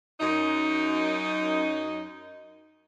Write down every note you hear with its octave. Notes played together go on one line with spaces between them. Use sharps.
F#2 D#4